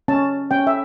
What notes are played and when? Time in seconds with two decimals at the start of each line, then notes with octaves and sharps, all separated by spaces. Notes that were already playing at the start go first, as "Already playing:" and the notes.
0.08 C#4 A5
0.51 C#4 G5
0.67 E5